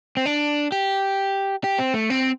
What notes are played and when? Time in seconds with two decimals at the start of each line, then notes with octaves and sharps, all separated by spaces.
0.17 C4
0.26 D4
0.72 G4
1.64 G4
1.78 C4
1.94 A3
2.10 C4